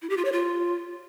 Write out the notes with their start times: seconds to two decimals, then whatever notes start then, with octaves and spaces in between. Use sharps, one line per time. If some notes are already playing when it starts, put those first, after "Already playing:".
0.02 E4
0.10 G4
0.17 F4
0.25 C#5
0.32 F4